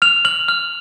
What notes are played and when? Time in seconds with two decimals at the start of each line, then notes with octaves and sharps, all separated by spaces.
0.02 F6 F7
0.25 F6 F#7
0.48 F6